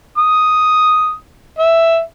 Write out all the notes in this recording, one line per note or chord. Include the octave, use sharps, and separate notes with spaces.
D#6
E5